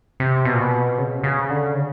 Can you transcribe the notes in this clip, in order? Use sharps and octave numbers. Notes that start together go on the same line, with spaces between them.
C3
B2
A#2
B2
C#3
C3
C#3
D3
C#3